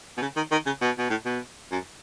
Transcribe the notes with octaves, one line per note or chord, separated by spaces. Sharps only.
B2
C#3
D#3
D#3
C#3
B2
B2
A2
B2
F#2